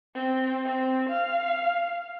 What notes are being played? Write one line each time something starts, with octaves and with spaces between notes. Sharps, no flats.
C4
C4
F5